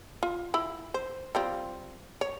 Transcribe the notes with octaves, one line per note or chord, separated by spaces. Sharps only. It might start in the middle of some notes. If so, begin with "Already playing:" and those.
F4
E4 B5
C5
G3 C4 F4
C#5